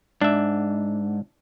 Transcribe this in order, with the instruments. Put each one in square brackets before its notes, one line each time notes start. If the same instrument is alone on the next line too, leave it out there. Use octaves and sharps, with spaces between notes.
[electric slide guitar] G#2 [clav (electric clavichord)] D4 E5